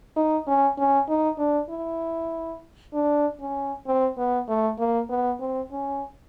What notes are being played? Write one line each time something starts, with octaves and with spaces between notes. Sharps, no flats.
D#4
C#4
C#4
D#4
D4
E4
D4
C#4
C4
B3
A3
A#3
B3
C4
C#4